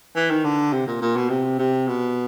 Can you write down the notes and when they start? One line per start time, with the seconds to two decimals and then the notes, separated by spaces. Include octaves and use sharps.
0.16 E3
0.30 D#3
0.44 D3
0.73 C3
0.87 A#2
1.02 A#2
1.16 B2
1.30 C3
1.59 C3
1.88 B2